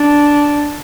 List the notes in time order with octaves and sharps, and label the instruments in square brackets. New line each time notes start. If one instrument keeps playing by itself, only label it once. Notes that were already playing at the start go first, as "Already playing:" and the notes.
Already playing: [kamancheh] D4